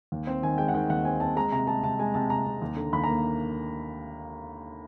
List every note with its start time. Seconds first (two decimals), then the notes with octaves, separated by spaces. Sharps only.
0.12 D#2
0.27 C4
0.43 D#3 G#5
0.58 G#3 G5
0.68 F#5
0.74 D#3 G5
0.90 D#2 F#5
1.05 C4 G#5
1.20 C4 A5
1.36 G#3 A#5
1.52 C3 A#5
1.67 G#3 A5
1.83 C3 A5
1.99 G#3 G#5
2.14 C3 A5
2.30 C3 A#5
2.46 C3
2.62 D#2
2.76 D3
2.93 D#2 B5
3.04 A#5
3.08 A#3